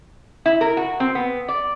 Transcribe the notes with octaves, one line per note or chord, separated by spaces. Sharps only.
E4
A#4
F#4
C4
B3
D5